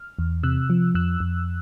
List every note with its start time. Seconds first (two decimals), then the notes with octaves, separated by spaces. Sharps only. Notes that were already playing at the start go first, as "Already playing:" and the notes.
Already playing: F6
0.19 E2
0.43 C3 E6 F#6
0.70 F3
0.95 F2 E6 F#6
1.20 F2